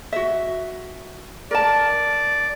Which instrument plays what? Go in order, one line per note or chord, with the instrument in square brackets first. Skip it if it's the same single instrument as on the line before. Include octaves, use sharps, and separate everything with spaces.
[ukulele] F#4 E5
[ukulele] A#4 A5 [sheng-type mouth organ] D5